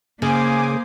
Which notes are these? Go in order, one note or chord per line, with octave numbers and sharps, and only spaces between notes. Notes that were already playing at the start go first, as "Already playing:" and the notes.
C#3 A#3 C5 G#5 D6 D#6